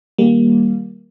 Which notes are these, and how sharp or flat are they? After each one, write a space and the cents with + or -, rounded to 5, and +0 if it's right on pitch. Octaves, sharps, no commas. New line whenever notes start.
D#3 +15 G3 +0 A#3 +10